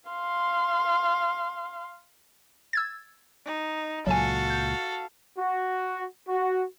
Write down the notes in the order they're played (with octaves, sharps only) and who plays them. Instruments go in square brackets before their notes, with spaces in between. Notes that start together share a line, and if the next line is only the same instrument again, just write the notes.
[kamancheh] F5 C6
[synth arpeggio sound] E6 G#6 A6
[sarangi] D#4
[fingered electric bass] C#2 A#2 [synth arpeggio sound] F#3 G#5 [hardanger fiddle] F#4 A4 [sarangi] F5
[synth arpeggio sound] G6
[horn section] F#4
F#4